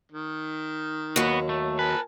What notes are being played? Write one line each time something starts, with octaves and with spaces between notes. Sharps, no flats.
D#3
D#2 F#3 B3 F#4
A3
A#4 B4 G#5 A5